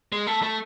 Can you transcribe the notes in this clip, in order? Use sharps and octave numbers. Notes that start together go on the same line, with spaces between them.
G#3
A3
A3